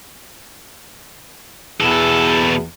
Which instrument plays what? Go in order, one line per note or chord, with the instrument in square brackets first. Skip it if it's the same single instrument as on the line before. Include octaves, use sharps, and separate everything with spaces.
[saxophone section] E2 [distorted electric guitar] B2 A4